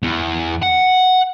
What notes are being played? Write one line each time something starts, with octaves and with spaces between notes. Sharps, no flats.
E2
F#5